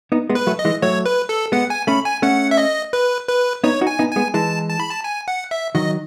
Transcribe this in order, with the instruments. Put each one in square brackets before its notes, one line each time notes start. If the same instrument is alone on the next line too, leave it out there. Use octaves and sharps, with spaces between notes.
[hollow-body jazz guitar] B3 D#4
G#3 B3
[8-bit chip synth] B4
[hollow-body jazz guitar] F#3 A3
[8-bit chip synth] D#5
[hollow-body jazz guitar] E3 G#3
[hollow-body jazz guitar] F#3 A3 [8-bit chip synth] C#5
[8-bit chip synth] B4
A4
[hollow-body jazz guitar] G#3 B3 [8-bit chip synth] F#5
[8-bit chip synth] G#5
[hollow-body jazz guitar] A3 C#4 [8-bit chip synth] B5
[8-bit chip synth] G#5
[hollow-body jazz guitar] A3 C#4 [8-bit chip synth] F#5
[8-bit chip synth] E5
D#5
B4
B4
[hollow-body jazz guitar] B3 D#4 [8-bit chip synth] C#5
[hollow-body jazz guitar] D#4 F#4
[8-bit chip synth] G#5
[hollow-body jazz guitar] B3 D#4
[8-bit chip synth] G#5
[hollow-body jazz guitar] G#3 B3
[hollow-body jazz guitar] E3 G#3 [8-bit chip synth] A5
[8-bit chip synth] A5
B5
A5
G#5
F#5
E5
[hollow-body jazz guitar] D#3 F#3 [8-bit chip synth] D#5